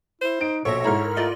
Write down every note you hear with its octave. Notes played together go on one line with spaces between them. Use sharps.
E4 C5
D#4 D7
A#1 B2 A4 C#5 E5 A#6
G#2 E4 A4 A#5 F6
A#4
A3 F4 D5 D#5